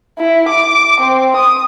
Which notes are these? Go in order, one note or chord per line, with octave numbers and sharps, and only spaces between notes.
E4
D6
C4
D#6